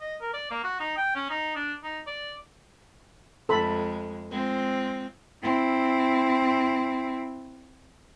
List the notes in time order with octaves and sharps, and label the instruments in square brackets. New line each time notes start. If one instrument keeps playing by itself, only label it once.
[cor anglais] D#5
A#4
D5
A#3
F#4
D#4
G5
C#4
D#4
D4
D#4
D5
[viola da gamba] F2 G#3 [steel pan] A4 B5
[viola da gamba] G#3 C4 F4
[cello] C4 E4